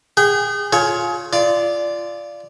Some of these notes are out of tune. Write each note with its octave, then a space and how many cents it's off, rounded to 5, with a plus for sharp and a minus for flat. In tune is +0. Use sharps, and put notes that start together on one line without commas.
G#4 -25 G5 -40
F4 +10 G#4 +30 C#5 +0
F4 -20 D5 +0